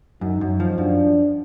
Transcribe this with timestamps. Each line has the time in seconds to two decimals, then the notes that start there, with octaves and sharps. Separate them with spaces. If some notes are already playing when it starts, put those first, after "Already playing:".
0.21 F#2 D#4
0.41 F#2
0.60 F3
0.78 F#2 D4